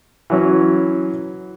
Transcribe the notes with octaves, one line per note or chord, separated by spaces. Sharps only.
E3 F#3 C#4